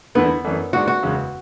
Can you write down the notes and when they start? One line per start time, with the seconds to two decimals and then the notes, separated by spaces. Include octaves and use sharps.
0.15 E2 D3 A3 B3 E4 A4
0.44 F#2 E3 A3 D4
0.73 G#2 G#3 D4 F#4
0.87 F#4
1.03 F#1 E2 C#3 G#3